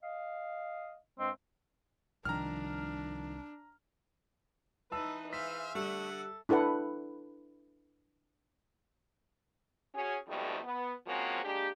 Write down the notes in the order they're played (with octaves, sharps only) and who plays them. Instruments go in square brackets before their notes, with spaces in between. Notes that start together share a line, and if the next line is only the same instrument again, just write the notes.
[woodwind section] D#5 F5
[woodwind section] G2 G#3 [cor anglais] C4
[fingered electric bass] C2 [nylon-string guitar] D#3 F3 [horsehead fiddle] D4 [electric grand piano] A#5 F6
[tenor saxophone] E3 [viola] D#4 B4 [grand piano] A5 E6
[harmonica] G#4 C5 F5 [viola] E5 [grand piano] B6
[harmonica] D3 F#5 [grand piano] G3 [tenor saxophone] A3
[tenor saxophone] A4
[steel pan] D4 E4 A4 B4 F#5
[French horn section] C#4 F#4 G#4
F2 G#2 B2 G3 A3 D#4
B3
F3 G#3 A#3 C4 C#4 F#4
G#3 A#3 D4 G4